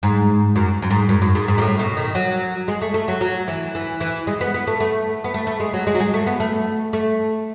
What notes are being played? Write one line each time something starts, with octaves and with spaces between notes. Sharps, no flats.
G#2
F#2
F#2
G#2
F#2
F#2
G#2
G#2
B2
A2
B2
D#3
F#3
G#3
A3
A3
F#3
F#3
E3
E3
E3
G#3
B3
B3
A3
A3
B3
A3
A3
G#3
F#3
G#3
F#3
G#3
A3
B3
A3
A3